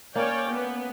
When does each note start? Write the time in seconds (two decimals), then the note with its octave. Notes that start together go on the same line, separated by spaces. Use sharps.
0.15 A#3 C#4 C#5 D5 G5
0.52 B3